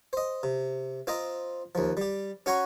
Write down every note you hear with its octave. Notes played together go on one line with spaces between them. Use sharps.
C5 D#5
C3
C4 F4 C5 D#5 A#5
D#2 F3
G3 G4
C#4 F#4 F#5 G#5 A#5 C#6